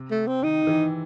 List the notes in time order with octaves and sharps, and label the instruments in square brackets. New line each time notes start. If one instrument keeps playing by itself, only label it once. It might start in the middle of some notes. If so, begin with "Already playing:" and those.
Already playing: [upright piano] C3
[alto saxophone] A3
C4
[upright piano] D#3 [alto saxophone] D#4
[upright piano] D#3
E3